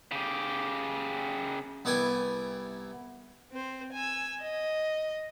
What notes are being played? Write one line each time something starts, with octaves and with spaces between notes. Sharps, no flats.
C#3 G4
C2 B3 E4 D5 G5 G#5
C4 C5
G#5 E6
D#5